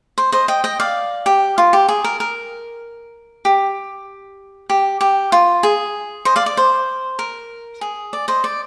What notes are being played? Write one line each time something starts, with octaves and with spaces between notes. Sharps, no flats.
C5
C5 D#5
D#5 G5
D#5 G5
D5 F5
G4
F4
G4
G#4
A#4
A#4
G4
G4
G4
F4
G#4
C5 D#5
D5 F5
D5
C5
A#4
G#4
D5
C5 D#5
D5